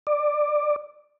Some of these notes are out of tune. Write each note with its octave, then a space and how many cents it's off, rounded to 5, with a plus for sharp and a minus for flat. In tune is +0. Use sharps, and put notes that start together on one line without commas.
D5 +15